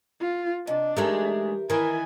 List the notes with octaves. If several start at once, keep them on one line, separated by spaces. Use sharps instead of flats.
F4
C3 D4 D#5
E3 G#3 A3 D#4 G4 A#4 E5
D#3 E3 E4 A#4 G#5